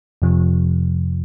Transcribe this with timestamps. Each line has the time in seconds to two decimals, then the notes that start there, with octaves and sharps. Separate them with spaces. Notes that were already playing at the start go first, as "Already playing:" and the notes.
0.22 F2 C3 F3